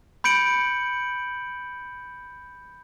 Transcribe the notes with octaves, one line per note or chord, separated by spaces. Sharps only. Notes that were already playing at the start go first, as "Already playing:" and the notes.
B5 G6 C#7 D7 F#7